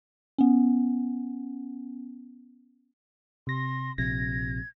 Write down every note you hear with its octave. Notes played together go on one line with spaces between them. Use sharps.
B3 C#4
C3 C6 A#6
A#1 C3 G#6 A#6